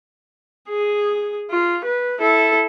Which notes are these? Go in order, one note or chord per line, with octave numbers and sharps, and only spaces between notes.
G#4
F4
B4
E4 A4